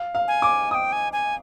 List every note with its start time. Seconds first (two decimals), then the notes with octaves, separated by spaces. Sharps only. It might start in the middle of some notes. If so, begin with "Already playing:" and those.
Already playing: F5
0.15 F5
0.28 G#5
0.42 D6
0.71 G5 G#5 D#6
0.92 G#5
1.12 G#5